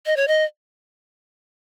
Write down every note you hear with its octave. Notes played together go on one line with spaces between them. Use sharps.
D#5
C#5
D#5